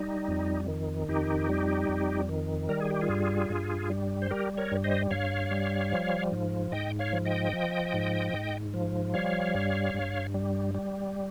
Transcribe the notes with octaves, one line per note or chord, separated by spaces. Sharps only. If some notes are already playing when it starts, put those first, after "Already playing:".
Already playing: G3 D#4
F2
D#3
F2 D#4 G4
G3
F2
D#3
G3 A#4
G#4
G4
F4 G#4
G2
G2
G3
C5
G3 G4 A#4
A#4 C#5
G2
C5 D#5
G2 C#5 F5
G3
F3
G#2
G#2 D#5 G5
C#5 F5
F3
D#5 G5
F3
G#2
G#2
F3
G3 C#5 F5
G2
G2
G3
G3